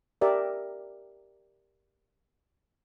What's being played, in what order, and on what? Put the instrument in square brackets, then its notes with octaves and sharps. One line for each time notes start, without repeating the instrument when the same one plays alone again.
[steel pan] G4 A#4 D5 E5